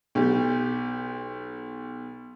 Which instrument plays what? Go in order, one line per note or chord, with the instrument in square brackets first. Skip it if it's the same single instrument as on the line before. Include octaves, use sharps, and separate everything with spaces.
[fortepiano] B1 G4